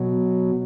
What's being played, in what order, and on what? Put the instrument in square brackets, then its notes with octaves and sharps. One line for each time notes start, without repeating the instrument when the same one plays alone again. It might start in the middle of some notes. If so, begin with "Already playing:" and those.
Already playing: [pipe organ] B2 F#3